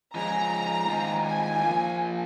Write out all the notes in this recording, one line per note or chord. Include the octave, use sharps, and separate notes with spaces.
F3 G#3 C#4 G#4 A#5
D#3 G#3 C4 F4 G#4
G#5
F3 A#3 F4